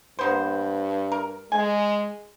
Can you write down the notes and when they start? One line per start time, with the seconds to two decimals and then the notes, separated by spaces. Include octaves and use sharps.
0.19 G2 A#3 B3 C5
1.12 A#4
1.52 G#3 G#5